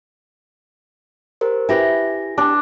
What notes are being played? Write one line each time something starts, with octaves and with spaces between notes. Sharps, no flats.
G4 A#4 C5
E4 G4 B4 G#5 A#6
D4 G4